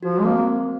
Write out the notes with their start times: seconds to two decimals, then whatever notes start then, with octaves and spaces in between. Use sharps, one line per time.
0.03 F3 F#4
0.18 G#3
0.25 A#3 C4